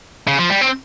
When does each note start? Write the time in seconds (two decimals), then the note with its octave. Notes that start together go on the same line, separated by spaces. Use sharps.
0.27 C#3
0.38 F3
0.50 G3
0.61 C4